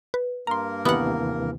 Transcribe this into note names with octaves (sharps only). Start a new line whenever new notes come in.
B4
G2 A#3 A#4 A#5 C6
D#2 C3 E3 B3 F#5